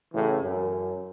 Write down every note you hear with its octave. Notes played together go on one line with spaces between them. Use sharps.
A1 A2 C#3 E3
F#2